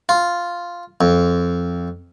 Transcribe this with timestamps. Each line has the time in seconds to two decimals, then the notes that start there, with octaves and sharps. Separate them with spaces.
0.09 F4
1.01 F2